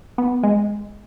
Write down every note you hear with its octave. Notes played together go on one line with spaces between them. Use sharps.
B3
G#3